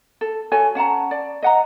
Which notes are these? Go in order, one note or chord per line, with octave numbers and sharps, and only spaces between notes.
A4
F#4 A4 C#5 G#5
C#4 F#5 A5 A#5
D5
D#5 F#5 A#5